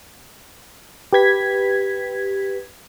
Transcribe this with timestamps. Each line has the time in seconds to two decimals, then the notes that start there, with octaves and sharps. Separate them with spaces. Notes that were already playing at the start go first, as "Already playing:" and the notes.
1.13 G4 B4 G#6 B6